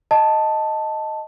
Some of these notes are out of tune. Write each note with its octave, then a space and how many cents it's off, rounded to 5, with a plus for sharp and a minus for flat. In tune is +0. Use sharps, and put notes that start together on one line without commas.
D#5 +0 A5 +0